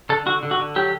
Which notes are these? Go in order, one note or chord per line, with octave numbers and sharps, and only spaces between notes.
D3 A4
D3 F#4
D3
F#4
D3
F#3 G4